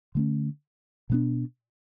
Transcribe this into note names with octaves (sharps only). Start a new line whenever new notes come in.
D3 A3 C#4
B2 G3 B3 D4